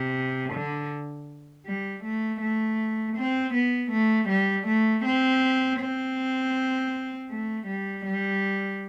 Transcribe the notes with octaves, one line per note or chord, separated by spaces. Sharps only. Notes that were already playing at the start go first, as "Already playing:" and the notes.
Already playing: C3
D3
G3
A3
A3
C4
B3
A3
G3
A3
C4
C4
A3
G3
G3